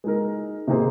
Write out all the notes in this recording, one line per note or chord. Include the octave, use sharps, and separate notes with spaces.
G#3 D#4 A#4
C3 D#3 A#3 G#4 C5